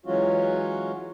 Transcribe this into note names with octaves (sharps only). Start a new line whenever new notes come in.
E3 F#3 G#3 C#4 F4 F#4